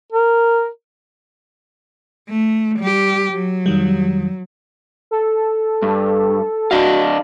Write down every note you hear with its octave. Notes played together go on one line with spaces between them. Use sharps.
A#4
A3
G3 G4
F#3
F2 D#3 G3
A4
G2
D4 F#4 D#5 F5